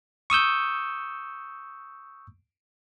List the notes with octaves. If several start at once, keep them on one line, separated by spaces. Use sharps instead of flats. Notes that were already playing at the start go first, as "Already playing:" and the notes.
C#6 D#6 E6 G6